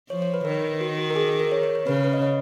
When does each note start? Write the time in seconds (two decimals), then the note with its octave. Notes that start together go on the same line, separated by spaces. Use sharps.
0.10 F3 C#5
0.22 C#5
0.34 B4
0.45 D#3 A#4
0.81 F#4
0.98 F#4
1.10 A#4
1.16 G#4
1.28 G#4
1.40 A#4
1.52 C#5
1.63 C#5
1.75 C#5
1.86 C#3 B4
1.95 C#5
2.04 B4
2.13 D#5
2.22 C#5